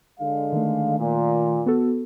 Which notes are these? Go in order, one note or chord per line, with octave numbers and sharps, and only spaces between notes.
D3 G#3 F5
D#3 A3
A#2
B3 F#4 A4